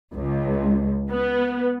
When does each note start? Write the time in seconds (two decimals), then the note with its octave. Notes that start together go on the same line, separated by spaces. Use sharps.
0.13 C#2
1.11 B3